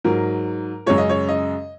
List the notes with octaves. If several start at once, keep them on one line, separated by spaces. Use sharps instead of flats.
G#2 F#3 A#4
F#2 C#3 G#3 C#5
D#5
C#5
D#5